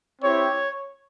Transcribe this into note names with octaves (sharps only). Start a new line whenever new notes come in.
C4 E4 G4 C#5